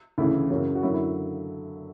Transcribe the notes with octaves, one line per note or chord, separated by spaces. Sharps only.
D2 C#3 E3 E4
F#2 C#3 F#3
F#4
F#2 D3 F#3 E4
E4